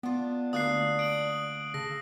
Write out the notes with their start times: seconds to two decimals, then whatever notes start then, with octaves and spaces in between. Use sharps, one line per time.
0.03 B3 D4 F4
0.53 D2 A#3 D#6 F#6 C7
0.99 D#6 D7 F#7
1.74 C#3 A4 A#6